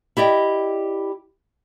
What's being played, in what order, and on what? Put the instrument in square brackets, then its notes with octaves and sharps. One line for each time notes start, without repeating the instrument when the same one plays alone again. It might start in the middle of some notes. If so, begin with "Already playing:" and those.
[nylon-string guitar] E4 G4 D5 D#5 G5